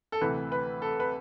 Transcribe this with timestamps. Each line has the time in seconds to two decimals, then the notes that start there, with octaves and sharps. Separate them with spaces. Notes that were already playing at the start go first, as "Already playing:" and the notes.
0.12 A4
0.21 D2 C3 E3 B4
0.52 B4
0.82 A4
1.00 B4